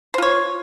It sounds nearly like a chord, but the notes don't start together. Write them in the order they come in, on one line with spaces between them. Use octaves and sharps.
C5 F4 C#5